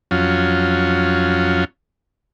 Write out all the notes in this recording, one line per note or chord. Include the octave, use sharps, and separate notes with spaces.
F2 F#3 C#4 F4